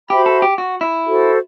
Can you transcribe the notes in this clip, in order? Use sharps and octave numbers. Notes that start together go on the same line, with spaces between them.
F#4 G4 C5 E5 B5
A4
G4
F#4
E4
F#4 A4 C5